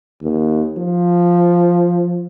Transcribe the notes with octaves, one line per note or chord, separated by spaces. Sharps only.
D#2
F3